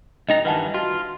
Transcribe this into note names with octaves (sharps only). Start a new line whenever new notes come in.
D2 D#4 D#5 G5 A#5
G2 D#3 E3 B4 F#5 A5
F4 F#4